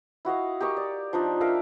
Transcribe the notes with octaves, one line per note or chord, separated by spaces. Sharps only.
E4 F#4 D#5 F5
G4 A#4 D#5 C#6
D5
F3 D4 D#4
A#4 E5 F5